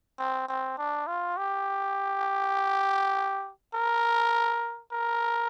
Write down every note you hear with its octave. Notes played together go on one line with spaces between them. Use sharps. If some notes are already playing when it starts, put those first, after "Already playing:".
C4
C4
D4
F4
G4
A#4
A#4